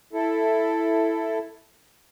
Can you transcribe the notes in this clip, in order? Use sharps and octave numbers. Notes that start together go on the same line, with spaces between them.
E4 A4